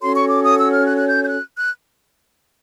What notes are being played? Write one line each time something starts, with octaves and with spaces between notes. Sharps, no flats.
C#4 F#4 A4 C#5 C6
C#6
D6
D#6
E6
F6
F#6
F#6
G6
G6
F#6
F#6